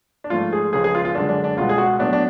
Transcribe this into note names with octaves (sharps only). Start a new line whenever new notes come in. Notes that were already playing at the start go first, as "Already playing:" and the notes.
D4
G#2 F3 A3 F4
G#4
C#2 C#3 F3 G#4
G#4
F4
F4
F#2 D3 G#3 D4
D4
D4
C#2 B2 G#3 B3 F4
G#4
F#4
A2 F#3 B3 D4
D4